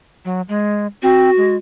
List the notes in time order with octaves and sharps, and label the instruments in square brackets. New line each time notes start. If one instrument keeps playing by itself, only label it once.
[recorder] F#3
G#3
[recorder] C4 [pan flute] F#4
[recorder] G#3